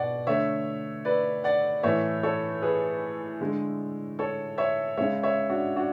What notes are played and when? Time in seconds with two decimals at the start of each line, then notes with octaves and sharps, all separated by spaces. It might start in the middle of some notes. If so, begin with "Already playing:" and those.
Already playing: B2 D5 F#5
0.26 D3 A3 C#5 E5
1.05 B4 D5
1.44 D5 F#5
1.83 A2 E3 A3 C#5 E5
2.23 A4 C#5
2.62 G#4 B4
3.41 D3 G#3
4.19 A4 C#5
4.58 C#5 E5
4.97 C#3 G#3 C#5 E5
5.23 C#5 E5
5.50 D4 F#4
5.76 D4 F#4